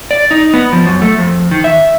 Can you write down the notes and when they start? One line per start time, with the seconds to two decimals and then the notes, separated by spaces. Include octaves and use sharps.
0.11 D5
0.31 D#4
0.54 B3
0.72 F3
0.86 F#2
1.02 A3
1.18 F2
1.51 D#3
1.64 E5